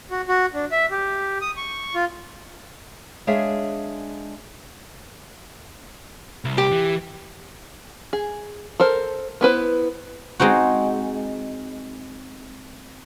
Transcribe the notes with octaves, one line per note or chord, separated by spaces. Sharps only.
F#4
F#4
D4
E5
G4
D#6
C#6
F4
G#3 D4 G#4 C#5 E5 F5
C2
G4
E3
G#4
A4 A#4 C5
B3 E4 B4 C5
G#3 C4 D#4 F#4